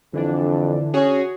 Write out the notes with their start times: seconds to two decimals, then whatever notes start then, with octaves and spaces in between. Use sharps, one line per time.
0.14 F2 D3 E3 D4
0.94 C#4 F#4 G#4 C#5